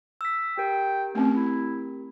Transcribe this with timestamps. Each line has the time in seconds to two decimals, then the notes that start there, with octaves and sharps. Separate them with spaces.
0.21 E6 B6
0.58 G4 A#4 G5
1.15 A3 C4 C#4
1.35 E4